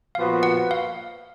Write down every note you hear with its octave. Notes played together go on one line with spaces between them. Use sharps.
A#2 F3 B3 F#4 B4 F5
F#5
F5